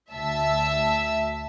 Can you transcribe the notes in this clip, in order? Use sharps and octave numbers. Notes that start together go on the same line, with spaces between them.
D2 E5 A5 E6